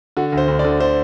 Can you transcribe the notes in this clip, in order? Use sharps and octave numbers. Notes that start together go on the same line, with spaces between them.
D3 F#4
D2 C5
D2
D5
D3
D3 C5